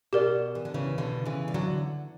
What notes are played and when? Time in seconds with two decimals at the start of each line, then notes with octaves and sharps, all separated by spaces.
0.13 B2 G4 A#4 D5
0.55 E3
0.65 D3
0.74 C#3 E3
0.98 B2 D3
1.26 C#3 E3
1.48 G3
1.54 D3 F#3